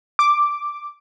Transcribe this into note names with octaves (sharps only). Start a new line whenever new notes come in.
D6